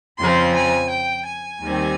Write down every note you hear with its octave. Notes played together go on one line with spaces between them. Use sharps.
F2 C#3 F3 C4 C6
G#5
G5
G#5
D#2 D#3 G3 C4